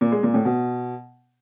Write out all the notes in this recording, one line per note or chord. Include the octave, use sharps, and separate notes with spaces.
A#2
G#3
A#2
A2
B2